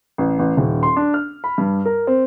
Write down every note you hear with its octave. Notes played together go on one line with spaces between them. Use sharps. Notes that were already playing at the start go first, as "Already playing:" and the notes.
A1
A1
D#1
C6
D4
F6
B5
G2
A#4
C4